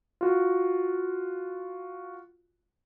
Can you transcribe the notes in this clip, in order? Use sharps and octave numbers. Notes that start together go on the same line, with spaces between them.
F4 F#4